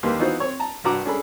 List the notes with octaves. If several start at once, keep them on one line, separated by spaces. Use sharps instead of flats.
D#2 A#3 G4 B4 C6
E3 B3 D#4 F4 F#4 C5
C4 C#5
A5 A#5
C2 G2 F#4 A#5 D6
C#4 D4 G#4 A4 B5